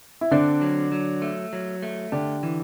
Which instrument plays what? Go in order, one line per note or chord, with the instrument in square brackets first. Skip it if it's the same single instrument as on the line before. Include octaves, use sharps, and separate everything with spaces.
[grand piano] E4
[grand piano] D3 D4 [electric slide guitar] C4
[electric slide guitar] F#3
F#3
A3
F#3
A3
[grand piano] D3 D4 [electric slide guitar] G4
[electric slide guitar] E3